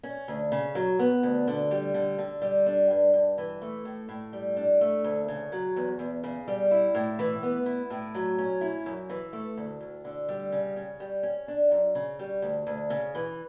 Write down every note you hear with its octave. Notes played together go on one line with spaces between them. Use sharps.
C#4
D2
C#3
F#3
B3
D2
D3
G3
D3
D3
G3
D4
G2
G2
E3
A3
A2
A2
G3
D4
A3
D2
C#3
F#3
E2
E2
C#3
G3
E4
A2
E3
B3
E4
A2
F#3
C#4
E4
F#2
E3
A3
D2
D2
D3
G3
C#3
C#3
G3
C#4
D4
F#2
C#3
G3
D2
D2
C#3
E3